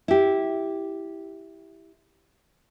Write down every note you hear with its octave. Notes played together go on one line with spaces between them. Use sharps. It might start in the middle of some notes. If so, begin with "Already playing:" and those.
E4 G4